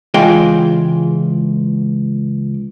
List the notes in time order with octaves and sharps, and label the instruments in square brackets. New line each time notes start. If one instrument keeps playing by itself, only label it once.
[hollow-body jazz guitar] C#2 E3 G#3 F4 G5